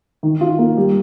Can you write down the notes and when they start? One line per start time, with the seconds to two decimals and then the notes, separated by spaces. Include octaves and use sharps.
0.23 D#3
0.41 F4
0.59 A#3
0.77 G3